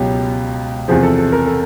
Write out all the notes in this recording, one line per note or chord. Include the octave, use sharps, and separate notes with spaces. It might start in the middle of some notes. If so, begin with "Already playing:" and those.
Already playing: C#2 B2 F#3 G4
E2 C3 F3 G#4
A4
A4
A#4
A4